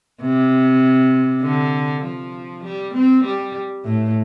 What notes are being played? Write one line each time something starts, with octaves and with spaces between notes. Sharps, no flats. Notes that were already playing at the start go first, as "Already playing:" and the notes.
C3
D3
F3
G3
C4
G3
A2